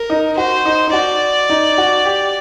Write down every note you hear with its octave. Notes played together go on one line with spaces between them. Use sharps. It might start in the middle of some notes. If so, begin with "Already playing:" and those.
Already playing: A#4
D#4
F#4 C5
D#4
D#4
F#4 D5
D#4
F#4
G4